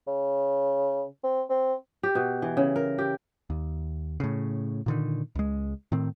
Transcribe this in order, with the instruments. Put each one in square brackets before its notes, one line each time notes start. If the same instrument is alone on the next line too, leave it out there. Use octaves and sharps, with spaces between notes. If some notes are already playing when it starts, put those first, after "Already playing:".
[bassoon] C#3
C4
C4
[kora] G4
B2
E3
C#3
A#4
G4
[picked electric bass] D#2
A2 C#3
A#2 D3 D#3
C#2 G#3
A2 D#3 C4